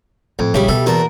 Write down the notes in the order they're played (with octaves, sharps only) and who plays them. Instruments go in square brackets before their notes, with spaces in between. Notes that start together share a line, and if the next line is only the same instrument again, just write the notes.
[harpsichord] F2 [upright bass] A2
[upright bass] A#1 [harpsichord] C#3 [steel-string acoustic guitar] G3 G4 E5
[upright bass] B2 [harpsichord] A4
[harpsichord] E2 A5 [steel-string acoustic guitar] A#2 F#4 A#4